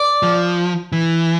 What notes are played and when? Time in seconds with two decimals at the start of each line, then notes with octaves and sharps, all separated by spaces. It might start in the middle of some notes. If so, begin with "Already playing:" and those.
Already playing: D5
0.23 F3
0.92 E3